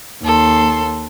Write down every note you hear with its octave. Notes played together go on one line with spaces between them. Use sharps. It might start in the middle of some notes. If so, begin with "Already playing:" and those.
D#2 A4 C6